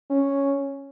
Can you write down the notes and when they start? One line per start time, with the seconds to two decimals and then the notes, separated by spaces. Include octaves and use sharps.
0.10 C#4